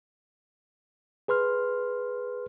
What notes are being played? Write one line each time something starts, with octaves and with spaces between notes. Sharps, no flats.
G#4 B4 C6 F6